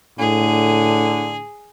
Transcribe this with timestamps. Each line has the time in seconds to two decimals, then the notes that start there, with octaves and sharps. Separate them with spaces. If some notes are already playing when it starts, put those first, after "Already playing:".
0.19 A2 D3 G#4